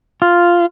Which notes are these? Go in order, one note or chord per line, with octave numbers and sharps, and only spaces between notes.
F4